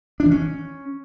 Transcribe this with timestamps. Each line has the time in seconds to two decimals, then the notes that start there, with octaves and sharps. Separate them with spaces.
0.20 D4
0.25 E3
0.31 C#4